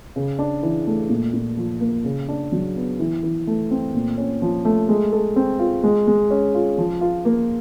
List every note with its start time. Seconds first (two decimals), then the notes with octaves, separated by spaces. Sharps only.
0.16 C#3
0.39 D4
0.63 E3
0.87 A3
1.10 A#2
1.34 A#2
1.57 F3
1.81 A#3
2.05 C#3
2.29 D4
2.52 F#3
2.76 B3
3.00 E3
3.23 E3
3.47 A3
3.71 C4
3.94 A#2
4.18 C#4
4.42 F3
4.65 A3
4.89 G#3
5.13 A4
5.36 C4
5.59 F4
5.84 G#3
6.07 G#3
6.31 C#4
6.55 F4
6.78 F3
7.01 F4
7.25 A#3